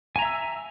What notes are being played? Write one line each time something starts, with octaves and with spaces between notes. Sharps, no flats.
E5 G#5 A#5 E6